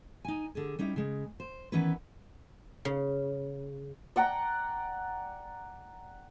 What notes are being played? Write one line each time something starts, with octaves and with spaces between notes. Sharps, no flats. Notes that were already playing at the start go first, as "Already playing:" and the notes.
D#4 G#5
D3 G4 G#4
G3 C#4 D#4 E4
C#3 G#3
C5
D#3 E3 B3 C#4 E4 B4
C#3
D5 F#5 G5 A#5